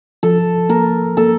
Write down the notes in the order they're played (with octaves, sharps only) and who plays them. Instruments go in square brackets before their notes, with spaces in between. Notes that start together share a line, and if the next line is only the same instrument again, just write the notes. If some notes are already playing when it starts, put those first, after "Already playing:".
[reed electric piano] F3 [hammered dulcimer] A4
[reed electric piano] A#3 [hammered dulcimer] A#4
[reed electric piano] A#3 [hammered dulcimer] A4